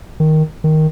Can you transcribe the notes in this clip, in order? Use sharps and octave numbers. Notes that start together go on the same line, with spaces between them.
D#3
D#3